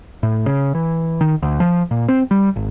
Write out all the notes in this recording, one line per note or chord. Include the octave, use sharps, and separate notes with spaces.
A2
C#3
E3
D#3
D2
F3
A#2
C4
G3
G#1